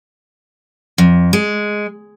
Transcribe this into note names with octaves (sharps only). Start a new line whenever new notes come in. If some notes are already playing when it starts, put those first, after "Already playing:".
F2
G#3